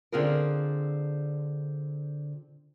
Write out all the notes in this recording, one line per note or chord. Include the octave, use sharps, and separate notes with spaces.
D3 C4 F4 G#4 A#4